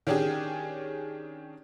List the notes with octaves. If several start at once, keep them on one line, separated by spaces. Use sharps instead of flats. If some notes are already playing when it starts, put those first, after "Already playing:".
D#3 C#4 D4 G4 G#4